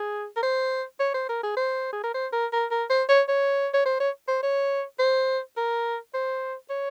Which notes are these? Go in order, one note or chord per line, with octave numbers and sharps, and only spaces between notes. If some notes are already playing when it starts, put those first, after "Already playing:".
Already playing: G#4
A#4
C5
C#5
C5
A#4
G#4
C5
G#4
A#4
C5
A#4
A#4
A#4
C5
C#5
C#5
C#5
C5
C#5
C5
C#5
C5
A#4
C5
C#5